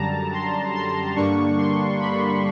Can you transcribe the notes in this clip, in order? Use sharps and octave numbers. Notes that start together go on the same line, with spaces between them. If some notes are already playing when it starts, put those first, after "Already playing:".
Already playing: F#2 D3 G3 A5 A#5
C6
C6
G2 D3 G3 A#3 D4 C#6
C6
B5